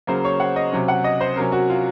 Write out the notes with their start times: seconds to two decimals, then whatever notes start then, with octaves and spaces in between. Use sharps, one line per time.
0.07 C#3 F#3 A#3 C5
0.24 C#5
0.40 F#5
0.56 D#5
0.72 C3 F#3 C#4
0.88 F#5
1.04 D#5
1.21 C5
1.36 C3 F#3 C#4 A#4
1.52 F#4
1.69 F4